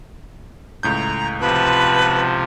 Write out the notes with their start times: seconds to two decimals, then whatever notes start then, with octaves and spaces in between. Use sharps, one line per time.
0.83 C#2 A2 A#5 G6
1.41 C3 F3 D#4 F#4 B4 A5